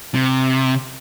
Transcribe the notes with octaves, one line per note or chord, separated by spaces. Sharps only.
C3